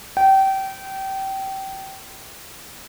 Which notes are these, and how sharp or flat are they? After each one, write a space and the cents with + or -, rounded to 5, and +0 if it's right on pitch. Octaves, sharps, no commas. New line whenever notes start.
G5 -25